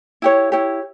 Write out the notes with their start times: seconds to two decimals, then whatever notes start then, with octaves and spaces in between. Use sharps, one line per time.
0.22 E4 G4 C#5
0.52 E4 G4 C#5